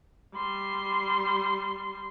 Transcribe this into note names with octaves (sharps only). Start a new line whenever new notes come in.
G3 C6